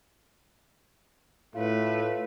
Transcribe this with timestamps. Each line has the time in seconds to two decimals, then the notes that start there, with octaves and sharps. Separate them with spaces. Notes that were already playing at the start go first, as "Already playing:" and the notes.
1.55 A2 A3 F4 B4